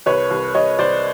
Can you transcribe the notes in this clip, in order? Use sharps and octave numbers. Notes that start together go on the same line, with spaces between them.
C2 B4 C#5
C2
C2 C#5 D#5
C2 C5 D5